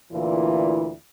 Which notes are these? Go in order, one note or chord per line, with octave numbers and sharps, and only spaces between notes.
D2 A#2 E3 E4 F4